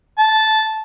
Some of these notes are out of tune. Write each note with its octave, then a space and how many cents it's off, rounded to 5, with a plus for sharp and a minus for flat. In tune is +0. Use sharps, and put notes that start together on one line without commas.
A5 -10